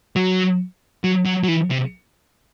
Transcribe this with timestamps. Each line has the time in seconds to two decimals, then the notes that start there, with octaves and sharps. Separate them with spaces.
0.16 F#3
1.04 F#3
1.26 F#3
1.44 F#3
1.48 E3
1.71 C3